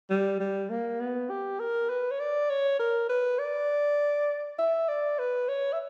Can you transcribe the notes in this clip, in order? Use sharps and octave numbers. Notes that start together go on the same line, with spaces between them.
G3
G3
A#3
B3
G4
A#4
B4
C#5
D5
C#5
A#4
B4
D5
E5
D5
B4
C#5
E5